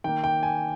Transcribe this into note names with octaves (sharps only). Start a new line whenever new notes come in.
D#3 A#3 G5
G5
G#5